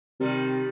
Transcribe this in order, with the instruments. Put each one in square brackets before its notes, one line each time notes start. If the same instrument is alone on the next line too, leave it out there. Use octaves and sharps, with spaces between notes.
[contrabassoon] C3 [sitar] D#3 G3